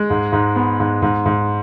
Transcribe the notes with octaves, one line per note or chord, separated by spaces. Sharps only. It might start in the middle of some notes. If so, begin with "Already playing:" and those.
Already playing: G#3
G#2
G#2
B3
G#2
G#2
G#2